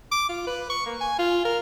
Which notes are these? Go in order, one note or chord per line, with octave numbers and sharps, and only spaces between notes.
D6
F4
B4
C#6
A#3
G#5
F4
A#4